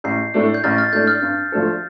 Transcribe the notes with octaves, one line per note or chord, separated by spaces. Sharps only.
A1 G6 C7
A2 A3 D4
G6
A1 F6 A6
F6 A6
A2 A3 D4 G6
F6
G2
F3 A3 D4 A4